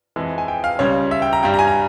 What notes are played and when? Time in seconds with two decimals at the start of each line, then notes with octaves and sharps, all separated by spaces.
0.16 F2 E3 G#3
0.38 G#5
0.48 G5
0.64 F5
0.79 C#2 C#3 G3 C#5
1.11 E5
1.22 G5
1.33 A#5
1.43 G2 G3 G5
1.54 A#5
1.59 G#5
1.67 A#5